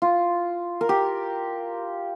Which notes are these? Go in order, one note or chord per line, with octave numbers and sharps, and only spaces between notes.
F4
A#4
G4